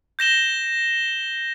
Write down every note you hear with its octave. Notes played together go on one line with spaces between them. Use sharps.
G6 A#6 E7 G7